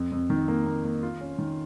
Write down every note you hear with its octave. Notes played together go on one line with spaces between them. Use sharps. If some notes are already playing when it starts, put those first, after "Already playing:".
Already playing: F2
F2
D#3
A#3
A#3
A#3
F4
C#4
D#3